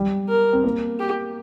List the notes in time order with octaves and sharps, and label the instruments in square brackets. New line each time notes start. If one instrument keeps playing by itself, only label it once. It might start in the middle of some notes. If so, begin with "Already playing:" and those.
Already playing: [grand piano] G3
[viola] A#4
[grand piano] C4
A#3
[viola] G4